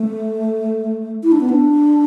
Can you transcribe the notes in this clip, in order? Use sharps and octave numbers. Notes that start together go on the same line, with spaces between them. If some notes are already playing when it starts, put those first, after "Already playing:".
Already playing: A3
E4
D4
B3
D4